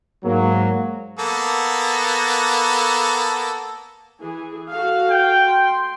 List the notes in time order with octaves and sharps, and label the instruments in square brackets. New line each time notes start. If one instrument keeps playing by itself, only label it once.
[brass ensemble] G#2 F#3 A#3
[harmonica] A#3 B3 A4
[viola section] E3 G#4
F#4 A4 F5
[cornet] G5
[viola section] C6